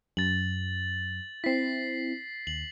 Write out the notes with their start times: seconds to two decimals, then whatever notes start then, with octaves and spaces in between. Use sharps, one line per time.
0.17 F#2 A6 F#7
1.44 C4 E4 B6 C7
2.47 D#2 F#7